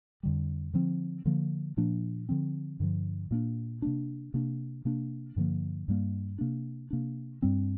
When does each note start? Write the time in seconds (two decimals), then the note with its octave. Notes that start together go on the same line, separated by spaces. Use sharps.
0.23 F2 D3 G3
0.73 D3 F3 C4
1.26 D3 F3 A#3
1.77 A#2 F3 A#3 D4
2.29 D3 F3 C4
2.80 G2 D3 F3
3.31 A#2 A#3 D4
3.82 C3 A#3 D4
4.34 C3 A#3 D4
4.85 C3 A#3 D4
5.36 G2 D3 F3 A#3
5.88 G2 G3 A#3
6.38 C3 A#3 D4
6.90 C3 A#3 D4
7.42 G2 G3 C4